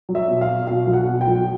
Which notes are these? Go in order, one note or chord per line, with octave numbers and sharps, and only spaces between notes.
F#3
E5
B2
F5
B2
B2 F5
B1
F#5
B2
G5
B1